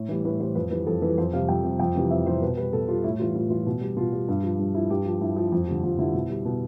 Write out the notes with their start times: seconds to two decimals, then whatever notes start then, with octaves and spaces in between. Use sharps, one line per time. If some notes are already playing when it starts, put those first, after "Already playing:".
Already playing: A2
0.09 E3 G3
0.25 A2 B4
0.40 E3 G3 C5
0.55 F2 B4
0.71 E3 G3 B4
0.86 F2 A4
1.02 E3 B4
1.07 G3
1.18 F2 C5
1.33 C3 G3 F5
1.48 F2 G5
1.64 C3 G3
1.79 F2 G5
1.95 C3 E3 G3
2.11 F2 E5
2.26 C3 E3 G3 C5
2.42 B2 B4
2.57 G3 B4
2.73 B2 A4
2.88 G3 F4
3.04 A2 E4
3.19 E3 G3 F4
3.35 A2 F4
3.50 E3 G3 F4
3.66 B2
3.81 G3
3.96 B2 F4
4.13 G3
4.28 G2
4.43 F3
4.59 G2
4.75 F3 E4
4.90 G2 G4
5.06 F3
5.21 G2 E4
5.36 F3
5.52 F2
5.67 D3 G3
5.83 F2 F4
5.99 D3 G3 E4
6.14 B2
6.30 G3
6.45 B2